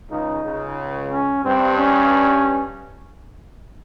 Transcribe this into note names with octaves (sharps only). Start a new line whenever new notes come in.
C#2 C#3 D#4
C#2 C#3
C#4
G2 C4
C#4